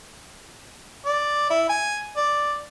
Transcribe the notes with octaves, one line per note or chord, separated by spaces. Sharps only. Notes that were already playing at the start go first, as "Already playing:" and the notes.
D5
E4
G#5
D5